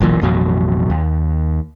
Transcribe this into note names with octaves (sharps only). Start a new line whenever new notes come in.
F#1 B1 A#2 E3
A1 F2 B2 F#3
D#2